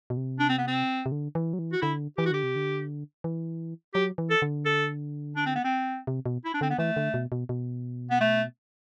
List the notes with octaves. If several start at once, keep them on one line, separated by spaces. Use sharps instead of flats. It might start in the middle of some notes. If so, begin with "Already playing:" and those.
B2
C3
D4
C4
B3
C4
C3
D3
E3
F#3
E3
F#4
D3 E4
E3 G4
F#4
D3 G4
C3
D3
E3
F#3 G4
E3
A4
D3
A4
D4
C4
B3
C4
C3
B2
E4
D4
D3 C4
B3
E3 A3
D3
B2
B2
B2
B3
A3